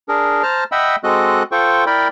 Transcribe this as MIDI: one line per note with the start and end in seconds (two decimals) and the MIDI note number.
0.09 0.43 62
0.09 0.43 68
0.09 0.43 70
0.43 0.64 72
0.43 0.64 81
0.43 0.64 82
0.43 0.64 89
0.72 0.96 75
0.72 0.96 76
0.72 0.96 78
0.72 0.96 79
0.72 0.96 83
0.72 0.96 88
1.04 1.43 56
1.04 1.43 60
1.04 1.43 66
1.04 1.43 69
1.04 1.43 75
1.04 1.43 90
1.52 1.85 65
1.52 1.85 69
1.52 1.85 72
1.52 1.85 79
1.52 1.85 85
1.86 2.08 64
1.86 2.08 70
1.86 2.08 74
1.86 2.08 79
1.86 2.08 83